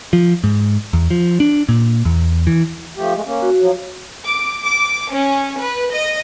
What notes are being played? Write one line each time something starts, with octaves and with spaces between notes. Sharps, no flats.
F3
G#2
E2
F3
D4
A#2
E2
E3
F3 A3 G4
G#3 A3
A#3 C#4
F#4
F3 F#3
D6
D6
C#4
B4
D#5